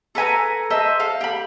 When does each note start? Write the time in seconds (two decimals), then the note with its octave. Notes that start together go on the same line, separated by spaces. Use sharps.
0.15 A4 B4 G#5 A#5
0.70 C5 D#5 E5 A5
1.00 A4 F5
1.21 G4 B5